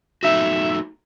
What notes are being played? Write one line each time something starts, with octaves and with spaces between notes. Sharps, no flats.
A3 D#4 F#4 E5